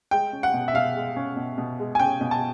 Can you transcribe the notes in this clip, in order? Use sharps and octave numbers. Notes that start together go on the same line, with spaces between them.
G#3 G5
C#4
F#5
B2
E5
B2 F5
G#3
C#4
B2
B2
G#3
G#5
C#4 G5
B2
A5